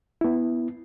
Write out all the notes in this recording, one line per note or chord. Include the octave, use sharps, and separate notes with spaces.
B3 E4